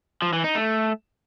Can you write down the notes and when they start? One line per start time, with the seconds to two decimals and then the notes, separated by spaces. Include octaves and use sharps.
0.22 F3
0.33 E3
0.44 D#4
0.55 A3